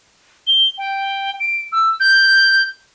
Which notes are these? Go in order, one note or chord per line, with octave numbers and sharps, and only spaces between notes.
G7
G5
D7
E6
G6